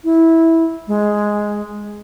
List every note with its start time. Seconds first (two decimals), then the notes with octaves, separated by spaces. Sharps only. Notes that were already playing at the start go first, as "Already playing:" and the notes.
0.04 E4
0.87 G#3